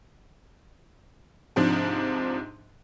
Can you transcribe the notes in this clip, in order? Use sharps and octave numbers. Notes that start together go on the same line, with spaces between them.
G#2 C3 F3 D4